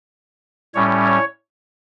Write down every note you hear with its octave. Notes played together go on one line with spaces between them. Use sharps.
A2 G3 C#4 C#5
C#5